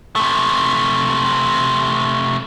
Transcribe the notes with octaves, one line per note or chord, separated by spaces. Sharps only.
C3 A3